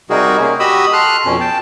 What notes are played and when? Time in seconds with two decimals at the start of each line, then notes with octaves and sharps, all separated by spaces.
0.10 C3 G3 D#4 F#4 G#4 A#4
0.40 A#3 C#4
0.60 F#4 G4 D#5 B5 D#6 E6
0.93 A4 C6 F6 F#6
1.25 F2 B2 C#4
1.40 G5 A5